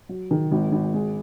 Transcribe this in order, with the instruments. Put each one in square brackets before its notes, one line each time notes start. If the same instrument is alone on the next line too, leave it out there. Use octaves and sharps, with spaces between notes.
[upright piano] F#3
D#3
G#1
G#1
G#3